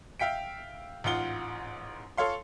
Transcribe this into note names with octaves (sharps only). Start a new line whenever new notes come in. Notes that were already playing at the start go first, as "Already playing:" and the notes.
E5 F5 G5 B6 D7
A1 G#2 F4 F#5 G7
A4 C#5 F5 C6